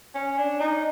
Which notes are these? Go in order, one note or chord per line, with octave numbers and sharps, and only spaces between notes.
C#4
D4
D#4